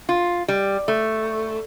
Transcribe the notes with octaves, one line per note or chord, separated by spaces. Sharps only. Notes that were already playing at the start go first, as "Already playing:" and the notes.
F4
G3
A3